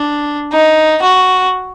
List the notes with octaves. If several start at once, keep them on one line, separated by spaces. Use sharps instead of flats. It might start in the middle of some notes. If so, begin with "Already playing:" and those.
Already playing: D4
D#4
F#4